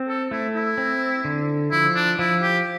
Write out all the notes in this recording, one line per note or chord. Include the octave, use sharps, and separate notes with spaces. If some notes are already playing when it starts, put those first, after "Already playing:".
Already playing: C4
A4
A3 E4
E4
C4
D3
F3 E4
D4
F3 E4
G4